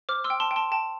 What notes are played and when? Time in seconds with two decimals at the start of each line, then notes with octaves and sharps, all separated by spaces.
0.09 C5 D6 F6
0.24 C6 E6
0.30 G5
0.40 A5 C6
0.51 G5
0.56 A5 C6
0.72 G5 A5